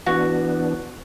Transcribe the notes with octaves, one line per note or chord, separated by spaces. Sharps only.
E3 B3 D4 F#4